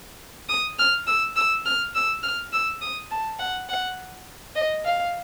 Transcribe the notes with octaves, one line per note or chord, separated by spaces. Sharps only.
D#6
F6
E6
E6
F6
E6
F6
E6
D#6
A5
F#5
F#5
D#5
F5